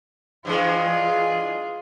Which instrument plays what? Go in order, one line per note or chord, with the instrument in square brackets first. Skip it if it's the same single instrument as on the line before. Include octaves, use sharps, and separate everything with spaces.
[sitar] G2 E3 G#3 [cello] F4 G#4